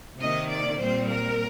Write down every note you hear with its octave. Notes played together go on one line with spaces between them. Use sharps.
C3 D#3 A#3 D#5
D5
A#2 G3 C4 C5
A#4